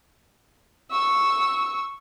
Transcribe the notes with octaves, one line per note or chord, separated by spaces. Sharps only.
C#6 E6